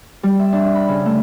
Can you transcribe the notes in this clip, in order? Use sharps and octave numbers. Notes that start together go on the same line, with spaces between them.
G3
E5
D4
B5
C#3
A3